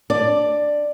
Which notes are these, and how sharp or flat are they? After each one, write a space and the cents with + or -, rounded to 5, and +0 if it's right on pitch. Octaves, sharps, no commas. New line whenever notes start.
D4 +0 D5 +10